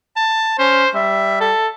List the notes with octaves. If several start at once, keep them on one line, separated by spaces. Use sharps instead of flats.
A5
C#4 C5
G3 E5
A4